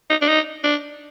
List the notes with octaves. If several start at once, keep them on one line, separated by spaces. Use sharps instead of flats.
D#4
D4
D#4
D4